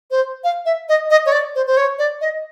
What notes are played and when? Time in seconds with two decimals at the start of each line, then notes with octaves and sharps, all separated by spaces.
0.11 C5
0.44 F5
0.65 E5
0.89 D#5
1.10 D#5
1.26 C#5
1.32 D5
1.55 C5
1.67 C5
1.77 C#5
1.99 D5
2.21 D#5